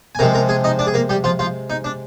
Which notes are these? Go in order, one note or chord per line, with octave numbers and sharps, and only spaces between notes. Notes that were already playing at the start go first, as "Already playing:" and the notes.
G#5
C3 F3 G#3 A#4 A#5
A#4 A#5
G#4 G#5
D#4 D#5
D4 D5
G#4
A#3 A#4
G3 G4
F3 F4
F3 F4
D#4
D4